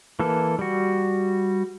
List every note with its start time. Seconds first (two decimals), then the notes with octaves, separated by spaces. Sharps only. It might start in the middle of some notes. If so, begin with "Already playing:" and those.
0.19 E3 A#3 A4
0.59 G3 F#4